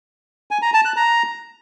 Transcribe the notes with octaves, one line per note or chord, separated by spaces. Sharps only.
G#5
A#5
A5
F#6
A#5